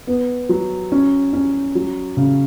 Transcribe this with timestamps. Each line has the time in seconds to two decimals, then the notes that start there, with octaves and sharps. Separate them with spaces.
0.07 B3
0.49 F#3
0.92 C#4
1.33 C#4
1.75 F#3
2.17 C#3